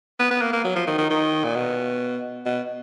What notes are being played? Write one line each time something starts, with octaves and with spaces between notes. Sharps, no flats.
B3
B3
A#3
A#3
F#3
F3
D#3
D#3
D#3
A#2
B2
B2